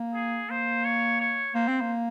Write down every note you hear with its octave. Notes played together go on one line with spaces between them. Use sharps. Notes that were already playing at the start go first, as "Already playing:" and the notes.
Already playing: A#3
G#4
A#3 C5
C#5
C#5
A#3 C5
C4
A#3